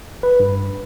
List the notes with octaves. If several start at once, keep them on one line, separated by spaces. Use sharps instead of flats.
B4
G2